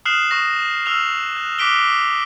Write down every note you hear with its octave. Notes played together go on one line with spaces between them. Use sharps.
D#6 F6 F#6 C7 E7 F#7
C#6 D#6 A#6
E6 F6 F7
F#6
D6 F#6 B6 D7 G7